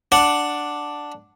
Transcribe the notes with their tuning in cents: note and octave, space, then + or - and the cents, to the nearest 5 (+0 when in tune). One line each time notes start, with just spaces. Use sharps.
D4 +0 F#5 +0